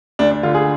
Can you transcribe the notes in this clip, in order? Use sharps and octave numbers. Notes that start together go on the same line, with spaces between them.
D2 D4
D4
D3 F4
G#4